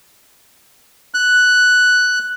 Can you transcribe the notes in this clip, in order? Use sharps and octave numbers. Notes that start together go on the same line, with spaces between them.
F#6